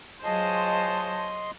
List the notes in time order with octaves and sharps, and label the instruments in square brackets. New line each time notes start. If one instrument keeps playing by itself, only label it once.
[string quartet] F#3 G#3 F4 [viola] C5 C#5 [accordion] D#5 C6 [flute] A5